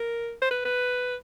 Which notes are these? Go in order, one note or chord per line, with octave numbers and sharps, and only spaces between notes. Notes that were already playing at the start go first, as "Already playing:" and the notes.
Already playing: A#4
C5
B4
B4